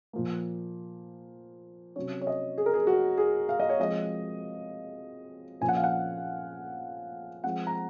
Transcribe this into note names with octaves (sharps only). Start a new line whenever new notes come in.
A#2 F3 A#3
C3 F#3 C#4 C#5
C#5
D#5
G#4
A#4
G#4
F#4
G#4
F5
D#5
C#5
F3 G#3 C4 D#5
A#2 F3 A#3 C#4 G#5
F#5
F5
F#5
F3 G#3 C4 F#5
A#5